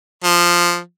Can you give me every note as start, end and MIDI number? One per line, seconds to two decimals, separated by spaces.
0.24 0.78 53